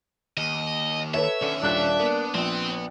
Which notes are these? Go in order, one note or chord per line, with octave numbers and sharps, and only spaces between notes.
D#2 D#5
A4 B4 C#5 E5
D3 D#3 C#4
D#1 D4 F#6
A#3 B3
A#1 B3 C4